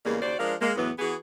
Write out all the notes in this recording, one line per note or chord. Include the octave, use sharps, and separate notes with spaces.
E2 C#3 G3 G#3 A#3
D#2 C#3 F#4 C5 D5
F3 G#3 D4 G#4 A#4 F5
G#3 A#3
E2 A2 E3 F#3 B3
E3 B3 F#4 G#4